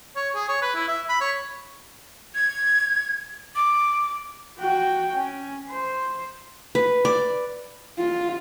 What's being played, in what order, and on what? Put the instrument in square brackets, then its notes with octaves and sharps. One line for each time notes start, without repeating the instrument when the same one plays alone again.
[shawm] C#5
G#4
C#5
B4
E4
E5
B5
C#5
[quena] G#6
D6
[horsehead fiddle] F#4 G5
C#4
C5
[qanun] B4
D5
[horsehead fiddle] F4